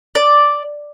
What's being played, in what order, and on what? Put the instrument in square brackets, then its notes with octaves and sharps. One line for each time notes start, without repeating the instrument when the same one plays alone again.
[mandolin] D5